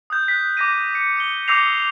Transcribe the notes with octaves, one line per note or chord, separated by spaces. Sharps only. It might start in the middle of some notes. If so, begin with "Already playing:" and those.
D#6 F#6 G6
F#6 B6
D6 F#6 A#6 B6 D#7
C#7
C#7 G7
D6 E6 G6 A#6 C7 F7